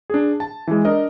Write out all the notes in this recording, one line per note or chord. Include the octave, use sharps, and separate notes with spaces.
D4 G#4
A5
E3 G#3
D4 A#4 D#5